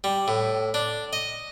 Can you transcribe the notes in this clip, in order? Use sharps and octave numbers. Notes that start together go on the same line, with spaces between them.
G3
A2
D4
D#5